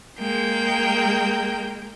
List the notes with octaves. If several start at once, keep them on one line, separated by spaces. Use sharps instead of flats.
G#3 A#3 G5